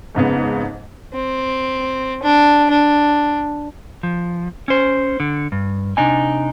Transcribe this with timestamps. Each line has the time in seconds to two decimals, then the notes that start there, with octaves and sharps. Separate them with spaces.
0.15 F2 G#2 C#3 B3
1.13 C4
2.22 D4
2.70 D4
4.03 F3
4.68 C#4 C5
5.20 D3
5.52 G2
5.97 C3 D4 D#4 G#5